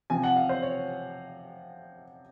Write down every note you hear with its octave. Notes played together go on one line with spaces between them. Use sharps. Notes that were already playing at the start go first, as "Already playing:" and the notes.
C3 F3 C4 G#5
F#5
F5
C5
C#5